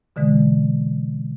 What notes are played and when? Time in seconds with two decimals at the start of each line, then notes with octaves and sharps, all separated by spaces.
0.16 B2 D3 E3 G#3